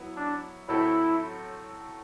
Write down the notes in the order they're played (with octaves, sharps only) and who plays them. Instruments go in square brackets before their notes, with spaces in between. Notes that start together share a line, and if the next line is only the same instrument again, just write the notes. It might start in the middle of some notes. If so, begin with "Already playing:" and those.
Already playing: [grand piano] F#3 B3 E4
[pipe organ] D4
[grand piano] A2 F#3 C4 F#4 A4 [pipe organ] E4